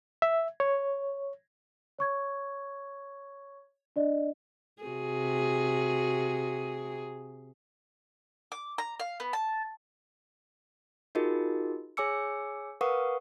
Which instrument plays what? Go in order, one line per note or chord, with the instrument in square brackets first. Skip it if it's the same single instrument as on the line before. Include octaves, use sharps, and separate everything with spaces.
[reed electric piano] E5
C#5
[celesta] C#5 C#6 G#6
D4 D5 D#5
[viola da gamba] C3 F#4 G#4
[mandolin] D6
A#5
F5
B3
A5
[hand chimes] D#4 F4 F#4 G#4 A#4 D#5
G#4 C#5 G#5 D6 E6 C#7
A#4 B4 F5 F#5 C#6 D#6